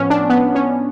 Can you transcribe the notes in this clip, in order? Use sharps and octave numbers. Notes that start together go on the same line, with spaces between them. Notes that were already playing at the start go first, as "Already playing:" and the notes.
Already playing: A2 F3 B3 C#4
D4
B3
C#4